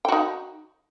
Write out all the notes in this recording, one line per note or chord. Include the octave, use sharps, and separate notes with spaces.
D#4 F#4 G5